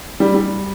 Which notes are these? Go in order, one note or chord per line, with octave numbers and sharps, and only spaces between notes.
G3
G3